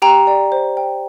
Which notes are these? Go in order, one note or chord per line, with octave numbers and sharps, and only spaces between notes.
G4 G5 A#5
D5 G5
C5
G5